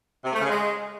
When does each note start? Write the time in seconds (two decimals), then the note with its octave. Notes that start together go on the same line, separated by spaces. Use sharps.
0.25 C3
0.33 A3
0.41 C#3
0.50 G#3